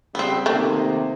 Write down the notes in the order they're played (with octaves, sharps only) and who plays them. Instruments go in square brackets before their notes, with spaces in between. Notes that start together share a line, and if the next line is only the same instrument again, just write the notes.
[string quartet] C#3 [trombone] G3 [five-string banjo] B3 C4
[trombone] C3 [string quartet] D#3 A#3 [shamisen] A3